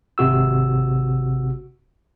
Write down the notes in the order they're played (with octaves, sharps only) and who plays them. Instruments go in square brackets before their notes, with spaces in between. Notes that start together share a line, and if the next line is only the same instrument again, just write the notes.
[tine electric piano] G#1 C3 F#4 E6